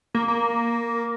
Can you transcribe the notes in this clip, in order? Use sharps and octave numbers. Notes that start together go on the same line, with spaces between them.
A#3
A#3